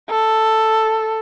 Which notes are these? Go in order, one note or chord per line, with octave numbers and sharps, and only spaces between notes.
A4